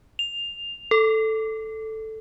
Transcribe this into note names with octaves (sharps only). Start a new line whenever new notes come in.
F7
A4